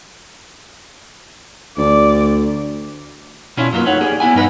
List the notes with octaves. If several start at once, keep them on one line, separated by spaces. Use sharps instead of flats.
D2 D5
B2 C#4 D4 E4 F4
F#2 F#3 A#3 D4 F4 B4
A3 D#4 C#5 F#5
G4 G#4 D5
B3 D4 E4 G#5
G2 D#4 B4 F#5